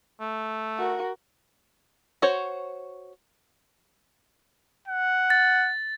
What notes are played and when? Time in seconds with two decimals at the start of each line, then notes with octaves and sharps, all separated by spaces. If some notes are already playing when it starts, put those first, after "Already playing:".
0.20 A3
0.78 F#4 A#4
2.22 F#4 C5 C#5
4.88 F#5
5.30 A6